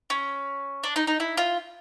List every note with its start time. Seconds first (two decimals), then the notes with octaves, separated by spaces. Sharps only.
0.10 C#4
0.84 D4
0.96 D#4
1.07 D#4
1.20 E4
1.37 F4